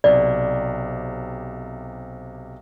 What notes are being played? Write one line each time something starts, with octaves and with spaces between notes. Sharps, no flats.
B1 C3 D5